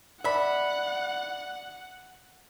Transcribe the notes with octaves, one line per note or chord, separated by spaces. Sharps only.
D5 E5 F#5 B5